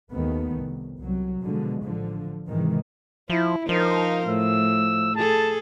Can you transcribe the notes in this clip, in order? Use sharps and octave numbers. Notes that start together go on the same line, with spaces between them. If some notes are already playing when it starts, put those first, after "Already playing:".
D#2 D#3 A3 B3
C2
C2 F#3
B2 D3 F3 G#3
A1 D3 F3
G#2 C3 D#3 E3 G#3
F3 E4
F3 D#4 A#4 C5
A2 E6
G#4 A4 A5